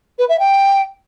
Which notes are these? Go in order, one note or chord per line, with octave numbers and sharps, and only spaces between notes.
B4
E5
G5